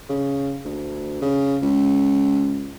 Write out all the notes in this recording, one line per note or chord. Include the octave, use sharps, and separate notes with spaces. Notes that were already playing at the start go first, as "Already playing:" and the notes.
C#3
D2
C#3
C#2